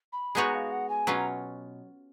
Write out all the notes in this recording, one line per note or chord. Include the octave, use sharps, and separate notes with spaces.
B5
G#3 B3 D#4 F#4 C#5 A#5
F5
F#5
G#5
B2 F#3 C#4 F4 A#5